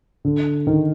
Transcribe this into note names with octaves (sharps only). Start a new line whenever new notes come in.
D3
D#3